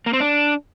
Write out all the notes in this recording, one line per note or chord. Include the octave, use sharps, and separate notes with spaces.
A#3
C4
D4